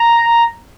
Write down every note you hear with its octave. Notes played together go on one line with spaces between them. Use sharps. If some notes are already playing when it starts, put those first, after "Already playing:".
Already playing: A#5